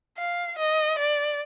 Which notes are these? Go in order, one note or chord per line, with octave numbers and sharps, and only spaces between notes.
F5
D#5
D5